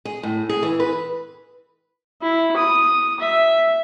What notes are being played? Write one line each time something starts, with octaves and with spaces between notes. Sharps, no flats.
G#4
A2
G#4
E3
B4
E4
D#6
E5